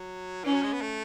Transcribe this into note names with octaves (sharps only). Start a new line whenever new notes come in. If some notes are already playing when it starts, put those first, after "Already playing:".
Already playing: F#3
E3 C#4
F#3
G#3
B3
A3